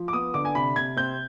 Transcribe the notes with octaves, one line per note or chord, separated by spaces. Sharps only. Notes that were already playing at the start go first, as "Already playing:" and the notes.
Already playing: F3
D6
B3 D#6
D3 D6
G#5
C3 B5
C3 G#6
C4 G6